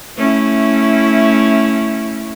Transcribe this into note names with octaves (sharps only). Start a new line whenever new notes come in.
A3 C#4 E4